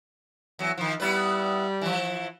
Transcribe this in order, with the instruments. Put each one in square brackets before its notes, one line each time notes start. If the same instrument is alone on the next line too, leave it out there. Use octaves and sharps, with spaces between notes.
[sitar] E2 F#3
D#3 F3
[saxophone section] G3 [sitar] B3 E4 B4
[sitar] E3 F3